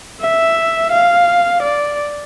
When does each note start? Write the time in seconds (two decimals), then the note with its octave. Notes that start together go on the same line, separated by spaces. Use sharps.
0.21 E5
0.92 F5
1.62 D5